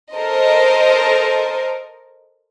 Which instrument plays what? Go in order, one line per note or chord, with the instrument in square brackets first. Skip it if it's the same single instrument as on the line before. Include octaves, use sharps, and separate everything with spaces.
[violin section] A4 A#4 C5 D#5